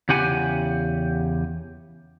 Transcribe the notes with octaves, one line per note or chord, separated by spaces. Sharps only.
E2 C#3 G4 F#5 G#5